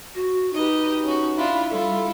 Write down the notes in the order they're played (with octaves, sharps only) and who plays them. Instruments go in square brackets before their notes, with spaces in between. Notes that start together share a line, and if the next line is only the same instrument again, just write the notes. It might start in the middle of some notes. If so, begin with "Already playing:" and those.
[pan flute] F#4
[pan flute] D#4 [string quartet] G4 B4 D#5
[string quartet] C#4 F#4
D4 E4 F4
[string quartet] G3 E4 F4 [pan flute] A4